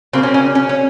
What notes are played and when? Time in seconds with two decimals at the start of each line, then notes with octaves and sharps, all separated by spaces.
0.13 C#3 F#3 A#3 C4
0.23 C#4
0.34 C#4
0.55 C#4
0.69 C#4